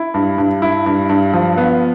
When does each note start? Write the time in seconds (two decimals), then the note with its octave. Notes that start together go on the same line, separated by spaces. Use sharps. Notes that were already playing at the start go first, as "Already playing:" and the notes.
Already playing: E4
0.14 G2
0.38 G2
0.62 E4
0.86 G2
1.09 G2
1.34 F3
1.58 B3